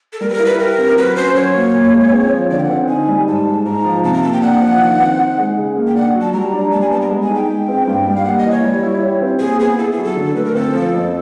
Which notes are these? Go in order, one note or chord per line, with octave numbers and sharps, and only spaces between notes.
A4
G3 A#4
B4
A#4
E4
B4
G4 A#4
C4
F#3 B4
C#4 C5
F#3 C#5
A#3
A#2
G#3
C4
F3
D3 D5
G5
F#5
C4
D#4 G#5
G3
G#2 A5
G#3
G#2 A#5
F3
C3 A5
A#5
A#3 A5
G5
D4 F#5
F3
D#3
C4
D#4
G#3
C#3
A#3
G5
D4 F#5
F#3
A5
G3 A#5
D4
G3 A5
G#5
B3 A5
A#5
G#3
G#5
D#4
G5
G#3
C4
G2
G3
F5
A#3 F#5
D#5
E3
C#5
G3
E4
G4
C4
A#2 G#4
B3 G#4
E4 A4
G#4
F#3
A4
D3
A3 B4
A#4
C4 A4
F3
F2